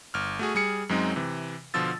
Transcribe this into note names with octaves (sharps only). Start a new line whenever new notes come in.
G1 F6
A3 F#4 G#4
G3 G#4 C#7
F#2 F#3 G#3 C4 D#4
C3 E3
B2 D3 F3 F4 E6 A6